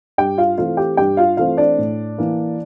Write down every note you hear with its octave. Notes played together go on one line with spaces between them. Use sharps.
G2 G4 G5
F4 F5
E3 A3 C4 F4 F5
G4 G5
G2 G4 G5
F4 F5
E3 A3 C4 F4 F5
D4 D5
A2
E3 A#3